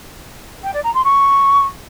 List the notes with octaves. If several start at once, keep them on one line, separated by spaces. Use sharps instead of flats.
G5
D5
A#5
C6
C#6